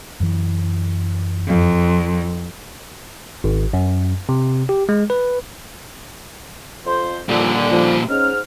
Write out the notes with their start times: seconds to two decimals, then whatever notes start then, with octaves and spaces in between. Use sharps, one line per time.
0.20 F#2 E3
1.47 F2
3.44 G#1
3.73 F#2
4.29 C3
4.69 G4
4.89 G#3
5.10 B4
6.85 F2 C5
7.29 A#2 D3 F3 G3
7.71 F3
8.09 G#2 C#4 F6